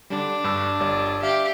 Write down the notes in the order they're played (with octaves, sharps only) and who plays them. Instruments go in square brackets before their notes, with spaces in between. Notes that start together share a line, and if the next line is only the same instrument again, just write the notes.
[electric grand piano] D3 G3 [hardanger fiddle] D4
[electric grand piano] G2 A5 E6
G1 G3 D5
[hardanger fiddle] G4 [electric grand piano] E5 F5